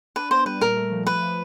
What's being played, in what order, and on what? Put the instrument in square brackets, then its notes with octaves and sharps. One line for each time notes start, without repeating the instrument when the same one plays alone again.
[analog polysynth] D4 [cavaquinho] B4
[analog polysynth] B3 [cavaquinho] C5
[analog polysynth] G3 [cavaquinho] B4
[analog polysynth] A#2 [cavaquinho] A#4
[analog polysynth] A3
F3
[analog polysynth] A3 [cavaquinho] B4
[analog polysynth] F3